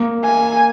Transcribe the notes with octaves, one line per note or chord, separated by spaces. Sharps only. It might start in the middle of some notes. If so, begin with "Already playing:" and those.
Already playing: A#3
G#5